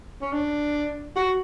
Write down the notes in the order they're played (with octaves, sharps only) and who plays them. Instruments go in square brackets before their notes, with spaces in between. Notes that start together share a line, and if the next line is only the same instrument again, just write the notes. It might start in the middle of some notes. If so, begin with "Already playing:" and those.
[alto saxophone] C#4
D4
F#4